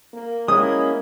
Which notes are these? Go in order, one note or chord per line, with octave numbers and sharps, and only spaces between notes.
A#3
G#3 A#3 C#4 E4 D#6